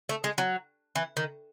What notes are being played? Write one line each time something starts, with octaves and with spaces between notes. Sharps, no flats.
A3
G#3
F#3
E3
D#3